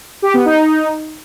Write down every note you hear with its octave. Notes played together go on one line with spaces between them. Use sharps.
G4
B3
D#4